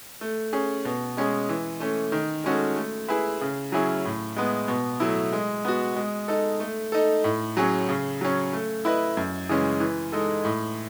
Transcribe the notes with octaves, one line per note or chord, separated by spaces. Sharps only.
A3
C#4 G#4
B2
G#3 C#4 G#4
E3
A3 C#4
D#3
G#3 C#4 F#4 A4
A3
E4 G#4 B4 E5
C#3
F#3 C#4 E4 G#4
A2
G#3 B3
B2
F#3 A3 E4
G#3
B3 F#4
G#3
D#4 A4
A3
D#4 A4
A2
F#3 C#4 G#4
C#3
F#3 C#4
A3
E4 B4 D#5
F#2
C#3 E3 G#3 C#4
E3
G#3 D#4 A4
A2